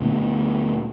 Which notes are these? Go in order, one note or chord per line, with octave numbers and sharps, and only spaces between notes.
D2 A#2 B3